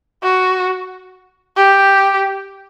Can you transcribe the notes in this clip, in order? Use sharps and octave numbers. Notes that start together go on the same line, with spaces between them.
F#4
G4